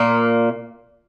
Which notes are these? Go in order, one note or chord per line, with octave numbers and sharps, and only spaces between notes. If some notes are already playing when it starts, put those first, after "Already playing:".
Already playing: A#2 A#3